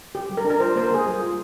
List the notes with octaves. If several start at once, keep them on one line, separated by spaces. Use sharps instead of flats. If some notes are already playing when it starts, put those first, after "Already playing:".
G4
G3
A#4
D4
A#4
F4 C5
A#3 C5
A#4
A#3 G#4
G3
F4